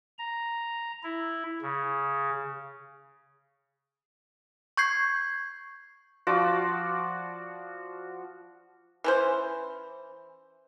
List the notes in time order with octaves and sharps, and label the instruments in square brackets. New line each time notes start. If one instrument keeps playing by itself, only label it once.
[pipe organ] A#5
E4
C#3
[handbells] C#6 G6 G#6 C7
[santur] F3 F#4 D5
[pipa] E3 C#4 C5